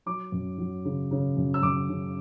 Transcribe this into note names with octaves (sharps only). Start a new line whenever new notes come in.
F#3 D6
F#2
F#3
C#3
C#3
F#2
E6
F#2 D6
C#3